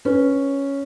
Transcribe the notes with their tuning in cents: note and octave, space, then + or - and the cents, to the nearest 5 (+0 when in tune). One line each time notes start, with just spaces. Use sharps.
C#4 +0 B4 +0